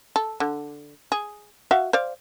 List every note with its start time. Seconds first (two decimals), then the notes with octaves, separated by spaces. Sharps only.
0.16 A4
0.40 D3
1.12 G#4
1.71 F#4 E5 F5
1.93 C5 D5 F5